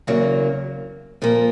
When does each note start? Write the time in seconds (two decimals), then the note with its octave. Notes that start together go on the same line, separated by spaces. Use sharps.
0.07 E2 C#3 F#3 A#3
1.22 A#2 F3 A#3